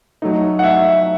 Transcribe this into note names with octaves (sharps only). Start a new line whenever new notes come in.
F#3 A3 D#4
F#5
E5